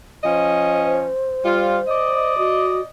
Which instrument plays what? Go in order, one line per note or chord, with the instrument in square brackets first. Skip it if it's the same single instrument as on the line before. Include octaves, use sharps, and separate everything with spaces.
[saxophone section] F3 C#4 D#5 [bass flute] C5
[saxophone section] G3 F4
D5 D#5
[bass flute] F#4